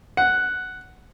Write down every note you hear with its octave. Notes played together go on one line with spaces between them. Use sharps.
F#5